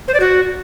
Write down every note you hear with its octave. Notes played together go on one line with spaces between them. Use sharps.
C5
D5
F#4